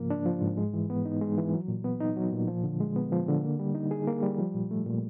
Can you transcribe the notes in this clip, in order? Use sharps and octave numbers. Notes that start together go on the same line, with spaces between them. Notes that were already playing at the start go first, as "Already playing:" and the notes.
Already playing: G#2 C#3 F3 A#3
D4
F3
G#2
G#3
E3
B3
D#4
G#3
E3
F#3
A#2
B3
D#4
F#3
A#2
F3
D3
G#3
B3
F3
D3
A#3
G3
D#4
G#4
A#3
G3
F3
A#2
A3
A#2